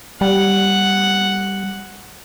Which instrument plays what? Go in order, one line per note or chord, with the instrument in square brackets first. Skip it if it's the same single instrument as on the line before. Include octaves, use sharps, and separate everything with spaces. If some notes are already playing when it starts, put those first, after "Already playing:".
[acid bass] G3 [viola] F#5